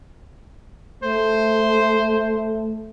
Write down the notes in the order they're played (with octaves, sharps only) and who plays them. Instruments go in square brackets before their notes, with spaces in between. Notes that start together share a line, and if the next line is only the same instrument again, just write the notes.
[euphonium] A3 [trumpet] C5